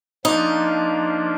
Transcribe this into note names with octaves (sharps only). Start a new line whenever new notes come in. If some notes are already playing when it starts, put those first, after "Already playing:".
F3 A#3 D4 D#4